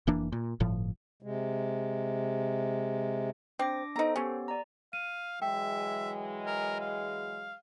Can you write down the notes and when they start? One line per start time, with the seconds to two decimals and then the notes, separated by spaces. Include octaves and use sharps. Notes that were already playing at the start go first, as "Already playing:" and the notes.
0.07 F1 E3 A#3 D4
0.32 A#2
0.60 G1 A2 F3
1.23 C3 G#3
3.59 C4 D4 D6 A#6
3.96 B3 D#4 A4 C5 A#5
4.16 B3 C#4 G4
4.48 D5 A#5
4.93 F5 D#7
5.42 E3 F#3 G#3 E5 G5
6.47 A#4
6.81 F5